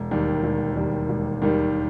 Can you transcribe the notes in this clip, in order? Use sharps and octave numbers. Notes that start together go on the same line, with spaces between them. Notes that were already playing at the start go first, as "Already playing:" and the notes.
Already playing: E1
D#2 D#3 G3
E1
D#2 D#3 G3
E1
D#2 D#3 G3